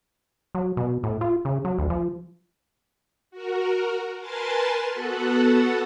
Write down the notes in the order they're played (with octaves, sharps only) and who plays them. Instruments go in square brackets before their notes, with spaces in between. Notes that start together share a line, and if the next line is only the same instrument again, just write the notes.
[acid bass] F#3
B2
A2
F4
C#3
F#3
D2
F3
[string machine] F#4 A#4
A#4 B4 G#5 A5 C6 A6
B3 F#4 A4 F#5